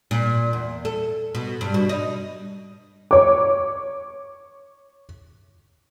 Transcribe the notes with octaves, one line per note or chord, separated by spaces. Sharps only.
A#2
E2
A4
B2
G2
B2
D#4
C#5 D6